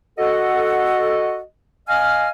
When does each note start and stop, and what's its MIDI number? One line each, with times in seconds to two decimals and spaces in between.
0.18 1.40 66
0.18 1.40 69
0.18 1.40 75
0.18 1.40 78
1.87 2.28 75
1.87 2.28 77
1.87 2.28 80
1.87 2.28 89